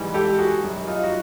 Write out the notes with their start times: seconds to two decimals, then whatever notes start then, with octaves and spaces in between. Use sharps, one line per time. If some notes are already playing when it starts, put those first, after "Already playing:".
Already playing: G#2 E3 G3
0.14 G4 A4
0.38 F#4 G#4
0.63 F#2 D#3 G3
0.87 D#4 F4
1.03 F#4